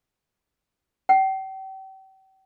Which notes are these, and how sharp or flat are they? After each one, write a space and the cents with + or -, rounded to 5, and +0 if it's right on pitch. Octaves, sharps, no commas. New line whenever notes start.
G5 -40